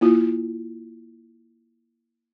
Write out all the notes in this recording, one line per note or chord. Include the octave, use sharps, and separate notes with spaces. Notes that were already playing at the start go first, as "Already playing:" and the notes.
A#3 E4 F4